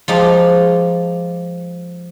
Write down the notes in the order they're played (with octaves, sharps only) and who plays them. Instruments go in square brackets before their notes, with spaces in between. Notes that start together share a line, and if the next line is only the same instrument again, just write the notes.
[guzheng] F3 G#3 D#4 G4